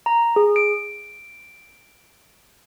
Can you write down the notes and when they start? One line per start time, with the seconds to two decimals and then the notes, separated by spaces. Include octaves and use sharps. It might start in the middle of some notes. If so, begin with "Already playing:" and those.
0.06 A#5
0.36 G#4
0.56 D7